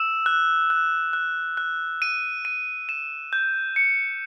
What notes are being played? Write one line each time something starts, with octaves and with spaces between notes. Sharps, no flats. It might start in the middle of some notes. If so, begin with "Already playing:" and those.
Already playing: E6 E7
F#6
F#6
F#6
F#6
D#7
D#7
E7
G6
C#7